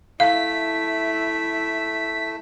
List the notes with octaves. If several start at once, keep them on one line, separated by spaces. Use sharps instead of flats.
A3 E4 E5 F5 B6